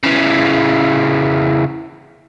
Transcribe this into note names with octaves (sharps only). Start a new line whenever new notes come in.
C#3 E3